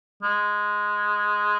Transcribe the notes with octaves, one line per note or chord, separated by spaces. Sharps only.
G#3